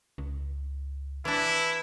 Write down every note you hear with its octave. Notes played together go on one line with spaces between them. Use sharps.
C#2
E3 D4 E4